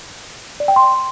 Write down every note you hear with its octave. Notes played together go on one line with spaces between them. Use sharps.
D5
G5
C6